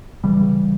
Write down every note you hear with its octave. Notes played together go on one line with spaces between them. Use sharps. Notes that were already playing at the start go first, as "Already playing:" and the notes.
C#3 E3 G3
C#3